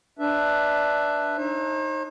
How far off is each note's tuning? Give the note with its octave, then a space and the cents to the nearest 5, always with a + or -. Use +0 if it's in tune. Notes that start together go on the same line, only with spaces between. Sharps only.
D4 +0 B4 +0 E5 +0
D#4 +0 C5 +45